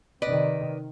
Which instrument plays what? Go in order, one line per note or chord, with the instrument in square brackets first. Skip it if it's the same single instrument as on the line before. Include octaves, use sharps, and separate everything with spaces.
[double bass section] C3 D#3 [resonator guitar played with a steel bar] B4 D5 D#5